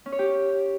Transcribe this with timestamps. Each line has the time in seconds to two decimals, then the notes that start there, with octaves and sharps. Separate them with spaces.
0.06 C#4
0.12 C#5
0.19 G4